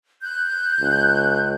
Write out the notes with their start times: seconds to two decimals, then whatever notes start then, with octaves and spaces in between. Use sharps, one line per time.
0.23 F#6 G6
0.81 C#2